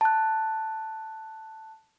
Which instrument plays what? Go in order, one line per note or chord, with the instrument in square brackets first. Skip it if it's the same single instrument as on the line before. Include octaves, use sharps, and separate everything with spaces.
[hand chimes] A5 F#6